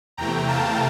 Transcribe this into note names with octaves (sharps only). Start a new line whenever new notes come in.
E2 C3 E3 A3 G5 A#5
F5 A5